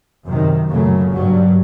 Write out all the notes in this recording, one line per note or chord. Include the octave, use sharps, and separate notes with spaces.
F#2 C3 D#3
F#2 A#2 C#3 F#3 A3
G2 F#3 G3